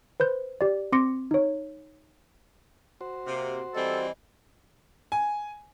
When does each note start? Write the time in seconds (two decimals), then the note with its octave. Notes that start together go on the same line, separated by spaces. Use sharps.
0.20 B4 C5 G6
0.61 G4 D5
0.92 C4 C6 D6 A#6 C#7
1.31 D#4 C#5
3.01 F#4 C5
3.25 C3 A#3
3.75 E3 G3 C4 A4 D#5
5.12 G#5